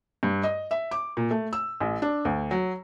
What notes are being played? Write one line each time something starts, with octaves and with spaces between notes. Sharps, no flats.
G2
D#5
E5
D6
A#2
A3
E6
A1
D4
D2
F#3